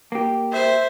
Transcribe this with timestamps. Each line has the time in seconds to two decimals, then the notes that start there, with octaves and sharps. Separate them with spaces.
0.12 A#3 G4
0.52 C5 E5